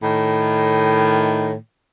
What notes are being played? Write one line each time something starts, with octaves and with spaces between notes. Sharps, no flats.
A2 D#3